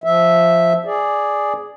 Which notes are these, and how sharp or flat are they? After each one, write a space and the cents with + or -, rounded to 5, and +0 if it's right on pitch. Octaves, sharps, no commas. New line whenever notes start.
F3 +0 E5 -5
G#4 +0 D5 +0